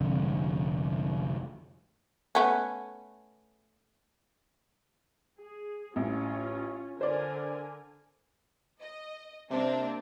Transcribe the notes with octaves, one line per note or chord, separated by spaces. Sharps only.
F1 A#1 D3
A3 B3 C#4
G#4
A1 C#4 F4
D3 A#4 C5 D5 G#5
D#5
C3 A#3 C4 D4